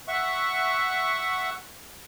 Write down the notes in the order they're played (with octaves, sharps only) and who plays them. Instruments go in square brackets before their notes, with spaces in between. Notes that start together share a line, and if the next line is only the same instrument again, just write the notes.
[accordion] E5 F#5 C#6